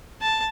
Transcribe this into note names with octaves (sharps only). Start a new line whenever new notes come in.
A5